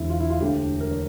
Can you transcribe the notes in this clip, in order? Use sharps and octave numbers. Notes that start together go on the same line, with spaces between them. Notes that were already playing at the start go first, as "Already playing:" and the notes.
Already playing: E1 E2 D3 E4
F4
E4
F4
E1 D2 D3 A3 G4
A#4
C#5